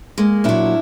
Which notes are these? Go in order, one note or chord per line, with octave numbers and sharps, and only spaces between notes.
G#3 A#3
A#2 F#3 D4 E4